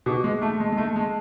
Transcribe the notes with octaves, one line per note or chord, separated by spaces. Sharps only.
B2 G#4
G#3
A3 A5
G#3
G#3
A3 A5
G#3